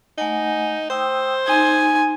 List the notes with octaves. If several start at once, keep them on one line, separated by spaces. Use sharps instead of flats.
A3 D#4 F#5 G#5
C5 G5 D#6 E6
D#4 G#5 C6